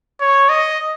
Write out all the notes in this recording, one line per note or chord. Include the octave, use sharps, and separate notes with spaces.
C#5
D#5